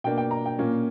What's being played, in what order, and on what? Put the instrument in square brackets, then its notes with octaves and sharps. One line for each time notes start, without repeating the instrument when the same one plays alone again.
[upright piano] B2 A#3 D4 G5
G5
A#5
G5
A#2 A#3 C#4